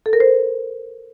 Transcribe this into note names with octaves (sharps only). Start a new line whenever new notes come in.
A4
A#4
C5